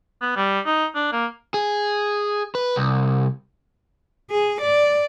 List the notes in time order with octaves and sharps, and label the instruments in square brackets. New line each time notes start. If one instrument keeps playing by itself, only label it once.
[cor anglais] B3
G3
D#4
D4
A#3
[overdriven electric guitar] G#4
B4
C2
[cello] G#4
D5